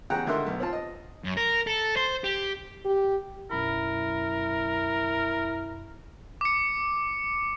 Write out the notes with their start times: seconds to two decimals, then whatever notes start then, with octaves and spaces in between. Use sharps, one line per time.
0.10 E2 C#3 F#5 G5 A#5 F#6
0.26 G#1 D3 A#4 E5 F#5 C6
0.46 B1
0.60 C4 F4 A5
0.73 D#5
1.24 F#2
1.37 A#4
1.67 A4
1.96 C5
2.24 G4
2.85 G4
3.51 B1 F#2 E4 A#4 B5
6.41 D6 C#7